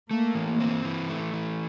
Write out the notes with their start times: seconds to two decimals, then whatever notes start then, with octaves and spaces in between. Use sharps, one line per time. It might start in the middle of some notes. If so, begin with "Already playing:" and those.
0.11 A3 A#3
0.35 E3
0.60 C4
0.85 E3
1.09 A3
1.33 E3